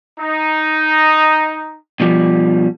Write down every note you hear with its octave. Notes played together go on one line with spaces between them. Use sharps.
D#4
B2 F3 G3